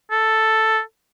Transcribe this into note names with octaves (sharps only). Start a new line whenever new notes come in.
A4